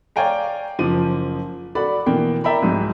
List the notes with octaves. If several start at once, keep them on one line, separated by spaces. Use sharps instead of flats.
C#5 D5 F5 G5 G#5 A#5
F#1 F3 D6 D#7
F#4 A4 D5 B5
B2 E3 A#3 G5
A#4 D5 E5 G5 A#5 B5
C2 G#2 F#3